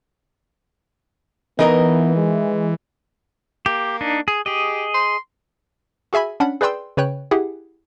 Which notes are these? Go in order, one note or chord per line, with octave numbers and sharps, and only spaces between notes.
E3 B3 D#4 A#4 D#5
G#3
A#3 G4
D4 D#4
G#4
G4 G#4 D#5
C6
F#4 G#4 E5 G#5 B5
C#4 D4 F#5 B5
G#4 B4 D5 G5 C6 E6
C#3 B4 C#5 G5 F#6
E4 G4 G#4 F#5